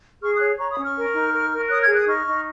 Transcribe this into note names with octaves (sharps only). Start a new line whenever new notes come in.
G#4 C#6 F6
D#6 F#6
C#5
C#5 A#5 C#6
B5 D#6
C#4
C#6 F6
A#4
D#4
A#4
A#4
C#5 D#6 F#6
F6 G#6
G#4
D#6 F#6
D#4 C#6 F6
D#4